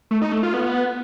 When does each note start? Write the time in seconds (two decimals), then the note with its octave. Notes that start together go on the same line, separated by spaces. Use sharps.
0.11 A3
0.22 D#4
0.32 A3
0.43 F4
0.54 B3